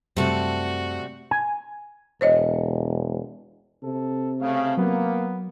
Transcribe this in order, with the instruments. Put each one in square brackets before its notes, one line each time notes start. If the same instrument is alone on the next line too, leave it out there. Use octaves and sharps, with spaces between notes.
[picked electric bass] F#2 C3 [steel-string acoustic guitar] G3 A5 [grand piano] A3 C4 [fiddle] F#4
[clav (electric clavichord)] G#5
[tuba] E1 [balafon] C5 C#5 D#5
[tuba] C3 [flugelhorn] A4
[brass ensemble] C#3 A3 [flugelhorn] F5
[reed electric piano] F#3 [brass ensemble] A#3 [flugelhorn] B3